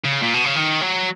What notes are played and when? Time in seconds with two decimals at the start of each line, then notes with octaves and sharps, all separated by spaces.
0.05 C#3
0.23 A#2
0.34 B2
0.45 C#3
0.56 D#3
0.81 F#3